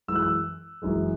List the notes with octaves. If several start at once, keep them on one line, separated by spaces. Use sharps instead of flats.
F#2 E3 G#3 E6
F#6
E6
F#1 F#2 E3 G#3